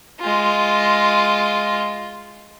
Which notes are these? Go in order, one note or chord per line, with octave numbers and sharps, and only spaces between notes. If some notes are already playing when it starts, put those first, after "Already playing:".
G#3 F4